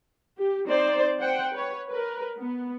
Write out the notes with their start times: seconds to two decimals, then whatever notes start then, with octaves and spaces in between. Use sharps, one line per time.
0.39 G4
0.67 C4 D#4 C5 D5
1.20 C5 F#5 G5
1.53 B4 C#5
1.90 A#4 B4
2.39 B3